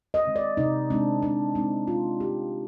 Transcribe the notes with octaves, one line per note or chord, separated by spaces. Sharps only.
D#5
D#3 G#3 C4
D5
C3 D#4
D#3 G#3 C4 D4
C3 D4
D#3 G#3 C4 D#4
C3 F4
D#3 G#3 C4 G4